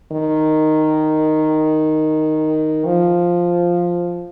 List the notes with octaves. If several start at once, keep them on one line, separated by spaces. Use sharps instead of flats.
D#3
F3